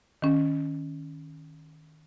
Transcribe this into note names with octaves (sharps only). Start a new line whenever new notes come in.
D#3 C#4